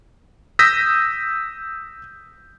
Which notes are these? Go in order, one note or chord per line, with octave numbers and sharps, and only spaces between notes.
D#6 E6 G6 A#6 B6